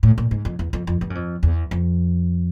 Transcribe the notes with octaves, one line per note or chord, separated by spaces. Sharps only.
A2
A#2
G#2
F2
E2
F2
F2
G2
F#2
F2
E2
F2